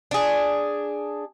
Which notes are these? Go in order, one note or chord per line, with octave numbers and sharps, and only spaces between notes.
D4 G#4